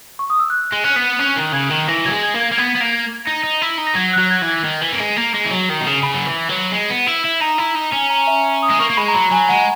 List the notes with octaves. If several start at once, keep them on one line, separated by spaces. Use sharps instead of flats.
C#6
D#6
E6
F#6
G#3
C#4 F#6
B3
C#4 F#6
D#3
C#3 G#6
D#3
E3 A#6
F#3 G#6
G#3
G#6
A#3
G#6
A#3
B3 G#6
B3
A#3
G#6
D#4 A#6
D#4
E4
D#4
A#6
F#3 G#6
F#3 F#6
G#6
E3
G#6
D#3
E3
A#3
G#3
A#3
G#3
E3
F#3
D#3
B2
C#3
C#3 B5
F#3
E3
F#3
G#3
B3
E4
E4
D#4 A#5
E4
D#4
C#4
A#5
E5
D#6
G#3
A#3 C#6
A#3
G#3 B5
A#5
F#3 B5
F#3 G#5
G#3 F#5